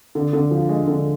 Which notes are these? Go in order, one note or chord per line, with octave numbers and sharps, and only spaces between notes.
D3
D3
F3
G#3
D3